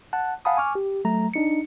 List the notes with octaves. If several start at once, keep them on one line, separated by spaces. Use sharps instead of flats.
F#5 A5 F#6
F5 F#5 G#5 A5 B5 D#6
G#5 C#6 D6 F6
G4
F#3 A3 A#5
D4 D#4 C#7